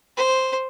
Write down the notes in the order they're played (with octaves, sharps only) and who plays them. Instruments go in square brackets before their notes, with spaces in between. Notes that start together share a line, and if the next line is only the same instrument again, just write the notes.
[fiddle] C5